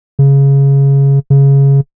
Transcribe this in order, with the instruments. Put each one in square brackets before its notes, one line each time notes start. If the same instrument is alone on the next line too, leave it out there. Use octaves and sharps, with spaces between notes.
[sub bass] C#3
C#3